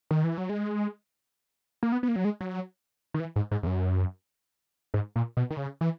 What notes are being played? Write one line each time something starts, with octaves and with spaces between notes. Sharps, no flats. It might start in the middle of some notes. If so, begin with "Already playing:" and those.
D#3
E3
F#3
G#3
A#3
B3
B3
A#3
F#3
G#3
F#3
D#3
E3
G#2
G#2
E2
F#2
G#2
A#2
B2
D#3
C#3
E3